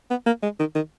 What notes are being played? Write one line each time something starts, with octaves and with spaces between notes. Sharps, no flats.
B3
A#3
G#3
D#3
D#3